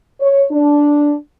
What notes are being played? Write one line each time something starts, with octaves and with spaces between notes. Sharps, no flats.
C#5
D4